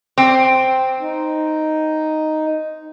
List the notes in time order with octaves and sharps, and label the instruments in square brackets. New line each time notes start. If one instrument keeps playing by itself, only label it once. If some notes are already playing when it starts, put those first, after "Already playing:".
[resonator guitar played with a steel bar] C4
[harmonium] D#4